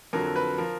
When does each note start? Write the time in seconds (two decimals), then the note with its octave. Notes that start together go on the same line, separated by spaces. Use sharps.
0.13 F2 D3 F#3 A#4
0.36 B4
0.58 F3 A#4